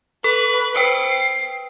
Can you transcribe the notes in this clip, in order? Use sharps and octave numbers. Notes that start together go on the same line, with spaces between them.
A4 B4
B4 C5 G5 C7